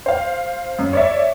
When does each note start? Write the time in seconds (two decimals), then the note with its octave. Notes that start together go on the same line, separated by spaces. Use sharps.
0.06 C5 F5
0.79 F#2
0.93 C#5 D5 E5